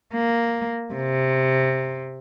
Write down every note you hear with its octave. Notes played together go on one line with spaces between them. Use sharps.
A#3
C3